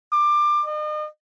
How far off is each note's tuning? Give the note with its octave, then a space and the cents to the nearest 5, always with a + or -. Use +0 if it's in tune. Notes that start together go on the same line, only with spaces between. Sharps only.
D6 +20
D#5 -40